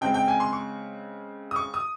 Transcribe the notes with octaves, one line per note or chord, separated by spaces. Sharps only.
C#3 G#3 C4 G5
G5
G#5
C6
C#6
D#6
C#6
D#6